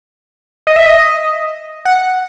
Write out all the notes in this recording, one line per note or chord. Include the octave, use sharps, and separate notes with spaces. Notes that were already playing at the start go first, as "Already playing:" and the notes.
D#5
E5
D#5
F#5